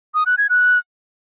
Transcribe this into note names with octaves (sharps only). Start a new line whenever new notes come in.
D#6
F#6
G#6
F#6